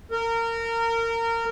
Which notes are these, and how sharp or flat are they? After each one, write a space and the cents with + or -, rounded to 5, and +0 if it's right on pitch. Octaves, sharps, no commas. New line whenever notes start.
A#4 -25